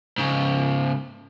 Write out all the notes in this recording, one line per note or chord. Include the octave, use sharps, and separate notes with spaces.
G#2 C#3